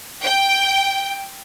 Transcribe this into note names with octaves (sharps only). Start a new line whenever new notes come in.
G5